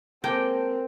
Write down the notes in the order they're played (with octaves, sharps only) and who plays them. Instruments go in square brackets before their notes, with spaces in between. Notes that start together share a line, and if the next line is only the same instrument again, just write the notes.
[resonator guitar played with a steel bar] G#3 A#3 A4 [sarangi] C4 [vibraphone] A#4 [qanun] G5